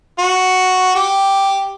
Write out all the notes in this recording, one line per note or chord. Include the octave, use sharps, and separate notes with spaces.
F#4
G4